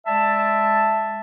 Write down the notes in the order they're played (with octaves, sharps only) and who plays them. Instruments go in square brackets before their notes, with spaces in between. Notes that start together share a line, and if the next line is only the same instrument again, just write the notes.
[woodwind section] G#3 D5 E5 A5